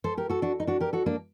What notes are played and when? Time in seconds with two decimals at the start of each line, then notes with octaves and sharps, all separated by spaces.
0.04 A4 C5
0.17 G4 A#4
0.30 F#4 A4
0.42 D4 F#4
0.60 D#4
0.67 D4 F#4
0.80 G4 A#4
0.93 F#4 A4
1.06 A#3 D4